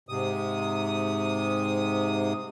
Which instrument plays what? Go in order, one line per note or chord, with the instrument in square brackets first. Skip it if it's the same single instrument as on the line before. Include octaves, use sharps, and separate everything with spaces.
[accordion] G#2 C3 D#6